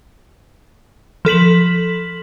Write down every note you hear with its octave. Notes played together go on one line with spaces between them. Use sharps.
F3 A4 B6 F#7